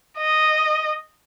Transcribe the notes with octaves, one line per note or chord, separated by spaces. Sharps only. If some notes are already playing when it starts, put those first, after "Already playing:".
D#5